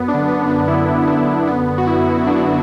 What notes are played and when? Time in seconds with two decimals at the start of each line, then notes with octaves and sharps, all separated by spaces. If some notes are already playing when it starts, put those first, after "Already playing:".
Already playing: F#2 B3
0.08 D4
0.14 D3
0.28 B3
0.41 F#2
0.48 D4
0.68 D3 E4
0.94 F#2
1.02 B3
1.08 D4
1.21 D3
1.47 F#2 B3
1.73 D3
1.78 F#4
1.87 E4
2.00 F#2
2.26 D3 D4
2.37 B3